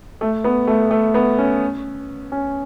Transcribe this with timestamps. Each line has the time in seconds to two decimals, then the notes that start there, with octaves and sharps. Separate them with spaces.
0.21 A3
0.44 B3
0.67 A3
0.91 A3
1.14 B3
1.38 C#4
2.32 C#4